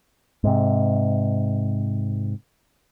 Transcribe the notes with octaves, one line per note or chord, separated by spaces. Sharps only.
G#2 C3